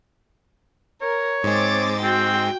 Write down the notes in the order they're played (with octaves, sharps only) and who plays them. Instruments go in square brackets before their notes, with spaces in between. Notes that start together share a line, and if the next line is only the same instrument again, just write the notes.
[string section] A#4 [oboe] C#5
[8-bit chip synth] G#2 G#3 [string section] C4 D6 A6
[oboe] C4 [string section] F#4 G5